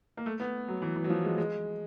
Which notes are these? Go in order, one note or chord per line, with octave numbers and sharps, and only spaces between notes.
A#3
A3
B3
F#3
E3
E3
F#3
F3
G#3
G#3